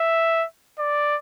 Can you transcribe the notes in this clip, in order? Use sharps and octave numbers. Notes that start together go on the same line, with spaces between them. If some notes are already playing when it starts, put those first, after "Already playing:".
Already playing: E5
D5